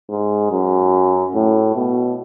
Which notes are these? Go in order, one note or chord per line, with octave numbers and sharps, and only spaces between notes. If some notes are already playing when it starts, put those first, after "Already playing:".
G#2
F#2
A2
B2